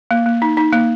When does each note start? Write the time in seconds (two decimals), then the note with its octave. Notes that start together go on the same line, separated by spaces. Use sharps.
0.11 A#3
0.26 A#3
0.42 D#4
0.57 D#4
0.72 A#3